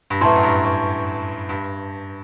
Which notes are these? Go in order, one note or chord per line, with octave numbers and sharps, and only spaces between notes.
G2
F#2 A2 B4 E5 A5 C6
F#2
G2
F#2
G2